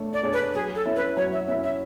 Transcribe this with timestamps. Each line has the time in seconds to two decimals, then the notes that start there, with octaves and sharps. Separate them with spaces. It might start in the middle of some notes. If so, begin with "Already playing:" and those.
Already playing: A3 D4 C#5
0.13 D5
0.23 D4 G#4 C#5
0.33 B4
0.54 F#3 G#4
0.75 A4
0.86 C#4 E4
0.96 B4
1.17 F#3 C#5
1.33 E5
1.48 C#4 E4 E5
1.64 E5